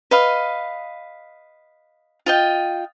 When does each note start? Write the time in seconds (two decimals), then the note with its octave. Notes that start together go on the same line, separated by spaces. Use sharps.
0.11 B4 D#5 F5
2.26 F4 D#5 G5